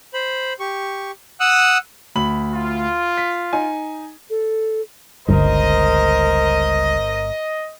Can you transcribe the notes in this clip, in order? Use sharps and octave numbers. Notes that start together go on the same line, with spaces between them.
C5 B5
G4 C#6
F#5 D#6 E6 F#6
D2 B5 F#7
F4
B6
D#4 G#5
A4
G1 C#2 G2 A#4 C5 D#5